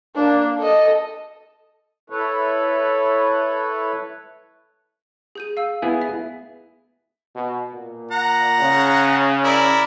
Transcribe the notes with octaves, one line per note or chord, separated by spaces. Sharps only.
A#3 D4
A4 D#5
E4 A4 B4 C#5
G#4 G6 D#7
F5 E6
B3 E4 G#4
E5
B2
A#2
F#5 A#5
C#3
E4 A#4 D5